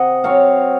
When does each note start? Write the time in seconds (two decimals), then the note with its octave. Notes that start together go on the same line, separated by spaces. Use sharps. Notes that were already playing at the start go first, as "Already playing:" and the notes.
Already playing: C3 D#5 F#5
0.24 F#3 C4 C#5 F5